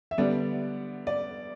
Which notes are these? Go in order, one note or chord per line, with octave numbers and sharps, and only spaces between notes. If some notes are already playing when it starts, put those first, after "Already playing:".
E5
D3 G3 B3 D4 D5
D5